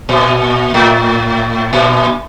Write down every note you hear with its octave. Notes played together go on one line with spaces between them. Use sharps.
A#2
A2
A#2